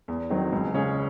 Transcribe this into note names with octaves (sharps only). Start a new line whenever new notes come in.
E2
D#3 F#3 C4
C#2
C#3 G#3 C#4 G#4